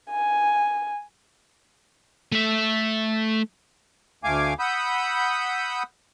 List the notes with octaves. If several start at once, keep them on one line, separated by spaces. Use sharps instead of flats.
G#5
A3 E5
D2 A3 F5 G#5 D6
F#5 B5 D#6 E6 G6